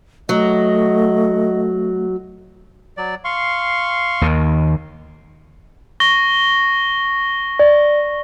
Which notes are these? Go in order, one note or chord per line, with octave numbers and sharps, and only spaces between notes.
F#3 A3 D#5
F#3 D5
F5 C6 C#6
D#2 D#3
C#6 A#6 G7
D5